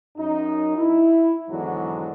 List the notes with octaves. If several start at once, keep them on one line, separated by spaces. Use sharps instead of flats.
F#2 D#4
E4
E2 G#2 D3 D#3 F#3